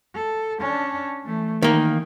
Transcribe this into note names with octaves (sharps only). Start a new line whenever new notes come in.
A4
C#4 D4
E3 A3
D#3 E3 A#3